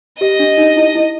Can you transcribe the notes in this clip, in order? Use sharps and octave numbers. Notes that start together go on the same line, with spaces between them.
G4 D#5
D4
D#4
E4
E4